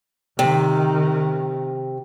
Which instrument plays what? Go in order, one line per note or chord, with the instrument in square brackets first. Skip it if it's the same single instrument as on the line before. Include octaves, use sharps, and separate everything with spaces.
[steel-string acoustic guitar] C3 [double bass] D#3